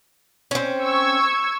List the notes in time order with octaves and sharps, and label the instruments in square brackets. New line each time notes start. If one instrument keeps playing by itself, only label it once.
[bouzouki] C4 C#4
[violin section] C#6 E6 G#6